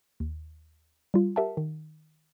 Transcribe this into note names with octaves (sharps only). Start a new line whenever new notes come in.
D#2
G3 F4
G4 A#4 E5 F#5 A5
D#3